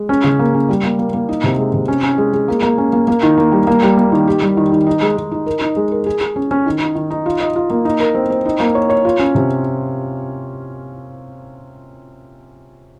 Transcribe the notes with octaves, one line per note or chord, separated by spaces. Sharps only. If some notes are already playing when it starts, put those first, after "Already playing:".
Already playing: G#3
C#4
C#3
A#3
C#4
G3
A#3
A#3
A#3
D#4
C3
G#3
C3
C#4
C#4
G#3
G#3
A#3
A#3
C#4
A#3
A#3
D#3
A#3
G3
A#3
G3
A#3
D#3
G4
G3
D#3
D#3
D#4
G#3
G#3
D#4
A#4
D#4
G#3
A#4
G#4
G#4
C#4
C#4
D#3
D#4
D#3
D#4
F4
D#5
F4
A#3
D#4
A#4
C4
C4
D#4
A#3
C#5
C#5
F4
C#4
C3